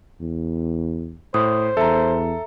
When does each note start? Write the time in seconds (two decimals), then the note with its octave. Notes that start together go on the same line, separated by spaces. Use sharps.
0.21 E2
1.34 A2 C5 D#6
1.77 E2 A4 E5 A#5